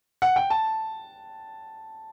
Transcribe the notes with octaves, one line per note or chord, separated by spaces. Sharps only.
F#5
G5
A5